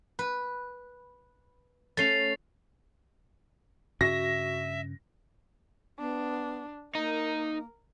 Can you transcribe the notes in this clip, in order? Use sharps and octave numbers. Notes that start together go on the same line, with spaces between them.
B4
A3 C#4 A6 C7 F7
G2 C#3 C#4 F#4 E5 A#6
B3 D4
A#3 D#4 A#4